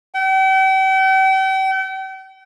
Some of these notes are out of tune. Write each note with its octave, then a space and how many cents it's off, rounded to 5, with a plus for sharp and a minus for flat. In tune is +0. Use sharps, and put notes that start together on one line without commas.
G5 -40